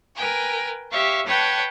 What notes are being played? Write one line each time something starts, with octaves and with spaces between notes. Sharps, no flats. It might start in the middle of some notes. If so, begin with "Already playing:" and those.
A#4 B4 G5 G#5
G4 C#5 E5 F5 C#6
B4 C#5 F#5 G5 A5 G#6